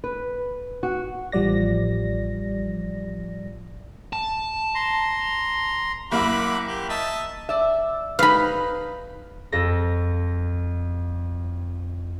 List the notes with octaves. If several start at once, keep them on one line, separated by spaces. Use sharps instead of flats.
B4
F#4
A1 F3 G3 D5 A#6
A5
A#5 C6
F#1 A#3 E4 F#5 B5 D6
G4
D#5 E5 A5
D5 E5
D#4 B4 F5 B5
F2 A4 A#6